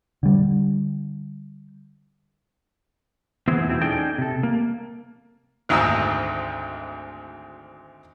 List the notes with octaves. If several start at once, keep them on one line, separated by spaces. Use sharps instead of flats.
D3 G3
E3 B3 C4 E4 G#4 C5
E2 B2 C4 E4
C#4 D#4 G#4 A4 D5 G5
C3 A4
A#3
G#1 D2 G#2 D#5 A#5 E6